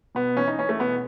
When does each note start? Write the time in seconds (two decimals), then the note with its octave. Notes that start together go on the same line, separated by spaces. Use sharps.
0.15 B2 B3
0.37 E3 C#4
0.48 D#4
0.59 E3 C#4
0.69 A3
0.80 B2 B3